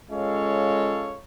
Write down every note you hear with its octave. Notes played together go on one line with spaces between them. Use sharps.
G#3 C#4 F4 A4 C#5 F5